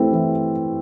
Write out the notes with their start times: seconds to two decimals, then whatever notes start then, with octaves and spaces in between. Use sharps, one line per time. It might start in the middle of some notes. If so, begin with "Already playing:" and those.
Already playing: E3 A3 C4 E4
0.12 E3